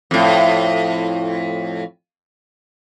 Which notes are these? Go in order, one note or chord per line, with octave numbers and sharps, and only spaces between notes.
F2 A2